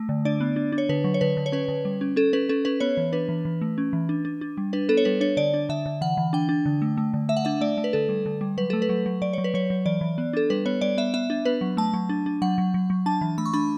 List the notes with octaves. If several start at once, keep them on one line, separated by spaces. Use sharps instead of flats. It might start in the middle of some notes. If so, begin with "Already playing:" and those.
Already playing: A3
D3
D4 D5
B3
D4
D4
C#5
D3 B4
F#3
C#5
D3 B4
D3
C#5
C#4 B4
D3
G3
C#4
C#4 A4
C#4 B4
C#4 A4
C#4 B4
B3 C#5
E3
D4 B4
E3
E3
A3
C#4
E3
D4
D4
D4
G3
D4 B4
B3 A4
C#5
G3 B4
D4 C#5
D3 D5
D4
D3 E5
D3
E3 F#5
E3
D4 G5
D4
D3
A3
A3
D3
A3 E5
F#5
D4 E5
A3 D5
A3
B4
D3 A4
G3
D3
G3
F#3 B4
A3 A4
B4
F#3
F#3
F#3 D5
F#3 C#5
B4
F#3 C#5
F#3
E3 D5
E3
B3
D4 A4
G3 B4
B3 C#5
G3 D5
B3 E5
B3 E5
D4
B3 B4
F#3
A3 A5
F#3
D4
D4
F#3 F#5
F#3
F#3
F#3
D4 A5
E3
A3 B5
C#6
D4 B5